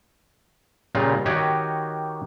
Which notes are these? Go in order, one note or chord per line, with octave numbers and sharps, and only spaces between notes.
A#2 C#3 G3 F4 A#5
D#3 F#4 G4 C#5 D#5